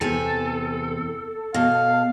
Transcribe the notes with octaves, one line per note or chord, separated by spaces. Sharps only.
E2 C3 A4 G#5
B2 F5